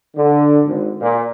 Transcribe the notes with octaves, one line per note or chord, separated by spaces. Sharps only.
D3
G#1
A#2